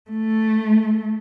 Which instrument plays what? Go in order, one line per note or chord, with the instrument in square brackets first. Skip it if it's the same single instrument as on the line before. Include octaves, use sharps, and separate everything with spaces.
[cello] A3